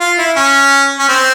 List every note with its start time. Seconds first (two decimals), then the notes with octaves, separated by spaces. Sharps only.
0.01 F4
0.18 E4
0.36 C#4
0.99 C#4
1.08 C4